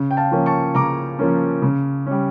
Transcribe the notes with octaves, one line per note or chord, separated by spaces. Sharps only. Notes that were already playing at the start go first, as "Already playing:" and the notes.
Already playing: C#3
G5
F5 A5
F3 A#3 C#4
A5 C#6
C#3 A#5 D6
F3 A#3 C#4
C#3
G3 C#4